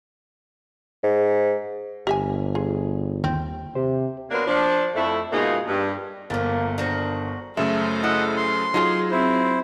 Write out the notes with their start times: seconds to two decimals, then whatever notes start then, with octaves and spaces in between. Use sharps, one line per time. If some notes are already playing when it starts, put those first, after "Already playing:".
1.03 G#2
2.07 G1 G4 E5 G#5
2.55 F4 G#4
3.24 D#2 C4 G5
3.75 C3 G4 C5
4.31 F#3 A#3 B3 D4 A#4 C5
4.47 F3 D4
4.95 F2 A3 E4
5.32 G#2 B2 A#3 D#4 F4 G#4
5.67 G2
6.30 G1 F3 A3 A#3 A#4
6.78 D#3 D4 F#4 C5
7.57 F#2 C#3 A3 A4 C5 E5
8.03 E4 D#5 F#5
8.37 C6
8.74 F#3 D#4 F4 G#4
9.11 C4 E4 C5